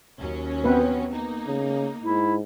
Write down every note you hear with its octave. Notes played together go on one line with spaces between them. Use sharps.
D#2 F#3 C#4
B3 C4 B4
A#3 D#4
C#3
G#2 E4